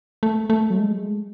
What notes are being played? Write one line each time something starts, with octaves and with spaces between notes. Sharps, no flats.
A3
A3
F#3
G#3